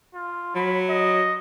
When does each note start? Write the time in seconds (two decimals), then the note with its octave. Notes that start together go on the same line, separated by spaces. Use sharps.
0.14 F4
0.55 F#3 B5
0.90 D#5